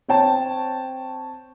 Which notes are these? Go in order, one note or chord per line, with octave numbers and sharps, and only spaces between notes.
C4 C#5 G5 A5